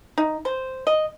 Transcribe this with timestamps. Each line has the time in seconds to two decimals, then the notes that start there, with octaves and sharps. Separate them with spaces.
0.18 D#4
0.45 C5
0.87 D#5